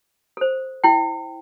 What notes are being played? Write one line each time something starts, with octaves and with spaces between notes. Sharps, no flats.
A4 C5
E4 G5